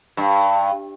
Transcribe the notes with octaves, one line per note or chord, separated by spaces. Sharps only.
G2